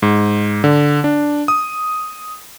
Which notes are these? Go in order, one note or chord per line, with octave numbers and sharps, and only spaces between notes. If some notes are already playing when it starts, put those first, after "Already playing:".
G#2
D3
D4
D#6